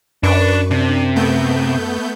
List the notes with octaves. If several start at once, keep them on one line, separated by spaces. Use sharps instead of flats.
F#2 D4 B4 C#6 D6
C3 D4
A3 B3 G6